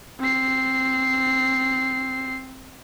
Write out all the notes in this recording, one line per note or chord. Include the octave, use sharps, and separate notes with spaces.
C4 C7